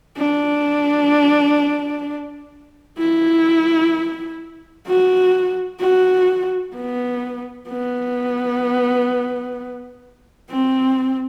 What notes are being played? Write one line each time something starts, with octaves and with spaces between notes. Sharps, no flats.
D4
E4
F#4
F#4
B3
B3
C4